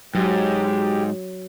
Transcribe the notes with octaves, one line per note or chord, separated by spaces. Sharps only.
G#2 F#3 G4